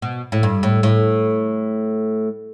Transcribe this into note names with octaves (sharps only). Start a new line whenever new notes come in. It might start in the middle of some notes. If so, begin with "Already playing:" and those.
B2
A2
G2
A2
A2